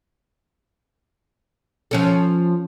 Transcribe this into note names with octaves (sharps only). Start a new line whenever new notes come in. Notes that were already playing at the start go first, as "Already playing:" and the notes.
F3 C#4 A4